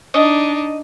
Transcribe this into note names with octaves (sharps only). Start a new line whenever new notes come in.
D4 D#4 D#5